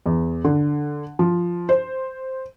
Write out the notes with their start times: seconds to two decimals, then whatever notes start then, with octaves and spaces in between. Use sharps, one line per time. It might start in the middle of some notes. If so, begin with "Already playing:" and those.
0.06 E2
0.45 D3
1.19 F3
1.69 C5